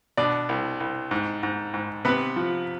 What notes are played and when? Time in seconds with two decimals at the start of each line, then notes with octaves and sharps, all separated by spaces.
0.17 B2 D4 D5
0.49 C2
0.80 C2
1.11 G#2
1.43 G#2
1.74 G#2
2.05 C3 B3 B4
2.36 F3